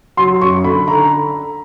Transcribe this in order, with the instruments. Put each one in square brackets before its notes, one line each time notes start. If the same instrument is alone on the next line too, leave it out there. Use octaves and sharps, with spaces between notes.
[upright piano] F#3 C6
F#2 C#6
D3 B5
D3 A#5